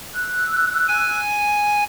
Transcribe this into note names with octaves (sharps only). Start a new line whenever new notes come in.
E6 F#6
G#5